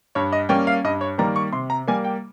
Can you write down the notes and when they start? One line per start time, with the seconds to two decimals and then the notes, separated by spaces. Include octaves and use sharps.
0.15 G2 C#5
0.32 D#5
0.49 G3 A#3 C#4 G5
0.67 F5
0.84 G2 D#5
1.01 C#5
1.18 D#3 G3 A#3 A#5
1.36 C#6
1.53 C3 C6
1.70 A#5
1.88 G3 A#3 G#5
2.04 G5